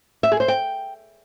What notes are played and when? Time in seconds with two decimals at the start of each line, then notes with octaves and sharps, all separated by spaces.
0.23 E5
0.32 G#4
0.40 C5
0.48 G5